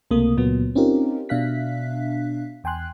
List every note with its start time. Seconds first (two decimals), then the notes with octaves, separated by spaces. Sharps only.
0.11 C#2 C3 A3 A#3 D#6
0.37 C#2 A#2 F#3 B3
0.75 C4 C#4 D#4 F4 G4 A#4
1.29 B2 D4 E5 F5 F#6 B6
2.64 E2 G5 G#5 C6 F#6